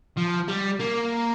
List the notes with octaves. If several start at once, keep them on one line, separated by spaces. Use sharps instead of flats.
F3
G3
A#3